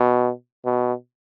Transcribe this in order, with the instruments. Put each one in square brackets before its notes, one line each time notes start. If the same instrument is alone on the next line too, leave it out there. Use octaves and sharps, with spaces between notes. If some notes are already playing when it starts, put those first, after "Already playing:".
Already playing: [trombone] B2
B2